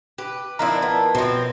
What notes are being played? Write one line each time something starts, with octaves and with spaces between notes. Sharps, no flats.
G4 B4
D#3 F3 B3 C4 D4 E4 A#4
A3 B3
B2 F3 C4 C#5 D#5